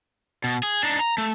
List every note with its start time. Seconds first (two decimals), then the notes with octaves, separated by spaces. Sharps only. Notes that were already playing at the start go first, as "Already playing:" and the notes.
0.44 B2
0.63 G#4
0.83 D4 D#4
0.99 A#5
1.18 A3